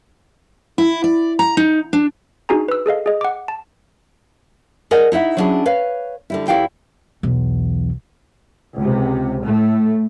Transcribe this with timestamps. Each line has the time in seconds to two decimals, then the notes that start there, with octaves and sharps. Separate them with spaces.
0.78 E4
1.04 D5
1.39 A#5
1.57 D#4
1.93 D4
2.49 D4 D#4 F#4 G#4 G#5 A#5
2.68 B4 E6
2.86 G#4 A4 D#5 F5
3.06 G#4 D#5
3.21 F#5 D6
3.48 A5
4.91 G#4 A#4 D5 D#5 F#5 G#5
5.12 D#4 E4 E5 F#5
5.37 F#3 G3 C#4 D4 E4 G#4
5.66 B4 C#5 F5
6.30 D3 G3 E4
6.48 E2 E3 E4 G4 F5 G5
7.23 B1 E2
8.76 C#2 C3
9.44 A2 A3